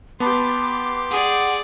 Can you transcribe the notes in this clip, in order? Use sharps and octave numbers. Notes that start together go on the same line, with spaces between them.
B3 G4 A5 B5 C6 D6
G#4 D5 F#5